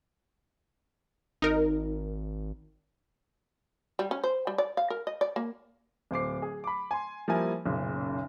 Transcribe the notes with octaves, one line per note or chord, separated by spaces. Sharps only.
G#1 D#4 A#4
G3
C#4
C5
G3
D5
F5
A#4
D#5
D5
A#3
D1 C5 D6 C7
G#4
B5 D6
G#5 C6
F3 G3 A#3 E4 G#5
F#1 B1 A#2 C#3